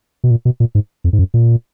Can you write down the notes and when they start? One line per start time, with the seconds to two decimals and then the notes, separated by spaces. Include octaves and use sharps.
0.24 B2
0.31 A#2
0.45 B2
0.60 A#2
0.75 G#2
1.04 F2
1.13 G#2
1.19 F#2
1.34 A#2